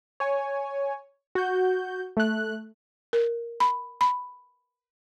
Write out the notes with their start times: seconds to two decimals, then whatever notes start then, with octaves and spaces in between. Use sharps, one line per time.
0.20 C#5 G#5
1.35 F#4 G6
2.17 A3 F#6
3.13 A#4
3.60 B5
4.01 B5